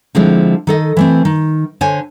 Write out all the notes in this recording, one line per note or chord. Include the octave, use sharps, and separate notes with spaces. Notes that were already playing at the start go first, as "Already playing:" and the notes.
D3 F3 G#3 C4 E4
D#3 A4 D#5
E3 A3 C4
D#3
D3 C5 C#5 G#5